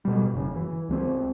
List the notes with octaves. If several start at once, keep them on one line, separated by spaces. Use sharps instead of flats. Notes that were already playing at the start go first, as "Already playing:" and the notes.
B2 G3
F#1 C#3
E3
C#2 G3 C4